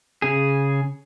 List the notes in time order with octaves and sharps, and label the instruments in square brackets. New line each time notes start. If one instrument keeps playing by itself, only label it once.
[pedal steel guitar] C#3 G#4